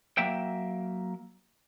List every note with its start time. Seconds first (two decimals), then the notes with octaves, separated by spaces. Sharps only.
0.18 F#3 A#3 E5 G5